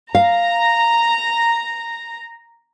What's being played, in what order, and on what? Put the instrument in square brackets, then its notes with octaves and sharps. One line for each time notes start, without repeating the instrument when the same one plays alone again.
[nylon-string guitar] F5 [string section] A#5